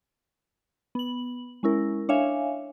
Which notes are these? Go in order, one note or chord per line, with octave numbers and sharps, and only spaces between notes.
B3 F#7
G#3 C#4 E4 A#4
D4 C#5 E5 F5 G#5